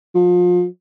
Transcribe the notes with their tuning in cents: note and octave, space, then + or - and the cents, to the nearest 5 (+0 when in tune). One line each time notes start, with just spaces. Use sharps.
F3 +30